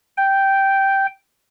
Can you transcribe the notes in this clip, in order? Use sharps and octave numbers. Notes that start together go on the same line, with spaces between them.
G5